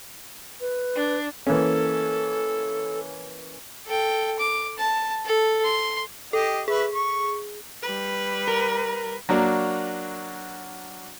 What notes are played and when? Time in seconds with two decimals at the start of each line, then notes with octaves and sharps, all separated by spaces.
0.61 B4
0.95 D4
1.47 E3 A#3 C#4 A4
3.86 A4 G5
4.38 D6
4.78 A5
5.26 A4
5.64 C6
6.33 G4 A4 D#5
6.68 G#4 B4 E5
6.94 C#6
7.83 G3 B4
8.48 A#4
9.29 F#3 A#3 D4 F#4